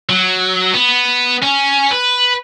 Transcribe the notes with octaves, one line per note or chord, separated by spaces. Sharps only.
F#3
B3
C#4
B4